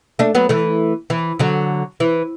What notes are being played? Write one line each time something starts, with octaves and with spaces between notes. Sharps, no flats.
A3 D4
F#3 B3
E3 A3
E3
D3 F#3
E3